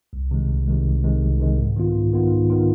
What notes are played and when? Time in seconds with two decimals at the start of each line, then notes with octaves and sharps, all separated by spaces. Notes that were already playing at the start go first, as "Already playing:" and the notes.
0.13 C2
0.31 C3 D#3 G#3
0.49 C2
0.68 C3 D#3 G#3
0.85 C2
1.04 C3 D#3 G#3
1.22 C2
1.40 C3 D#3 G#3
1.59 G#2
1.76 D#3 B3 F4
1.95 G#2
2.13 D#3 B3 F4
2.31 G#2
2.50 D#3 B3 F4